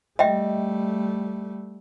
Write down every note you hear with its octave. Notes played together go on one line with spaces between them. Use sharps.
G3 A3 D#5 E5 G5